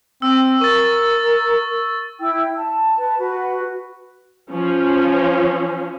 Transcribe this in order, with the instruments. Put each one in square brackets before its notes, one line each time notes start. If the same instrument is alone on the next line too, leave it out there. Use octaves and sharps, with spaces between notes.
[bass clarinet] C4 [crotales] E6
[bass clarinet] A#4 [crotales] C#6 A6
[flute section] E4 G5 E6
A5
B4 A5
F#4 B4
[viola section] F3 C#4